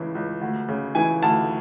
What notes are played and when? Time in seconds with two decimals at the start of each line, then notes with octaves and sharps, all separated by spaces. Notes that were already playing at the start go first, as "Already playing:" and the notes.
Already playing: C#2 C#3 E3
0.15 C#2
0.41 D2
0.68 C#3
0.95 E3 G#5
1.22 D2 A5